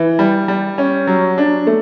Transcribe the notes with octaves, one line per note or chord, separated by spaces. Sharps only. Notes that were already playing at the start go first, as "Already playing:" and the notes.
Already playing: E3
G3
G3
C#4
F#3
D4
A3